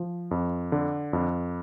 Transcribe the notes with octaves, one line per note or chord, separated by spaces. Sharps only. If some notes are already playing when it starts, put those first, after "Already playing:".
Already playing: F3
F2
D3
F2